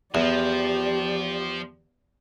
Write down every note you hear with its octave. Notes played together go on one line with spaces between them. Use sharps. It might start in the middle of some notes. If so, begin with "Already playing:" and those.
E2 F3 G4 D5